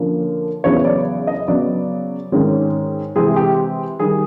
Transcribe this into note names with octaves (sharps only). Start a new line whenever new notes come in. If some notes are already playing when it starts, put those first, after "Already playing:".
Already playing: D3 F3 A#3 C#4
E2 C#3 F#3 B3 C#5
D5
D#5
C#3 F#3 B3 D5
G#2 D#3 G#3 C#4
C3 E3 G#3 C4 G#4
G4
D#3 G3 G#4